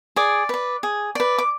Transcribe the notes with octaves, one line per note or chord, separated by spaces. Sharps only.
G#4 D5 D6
B4 D5
G#4
B4 D5
D6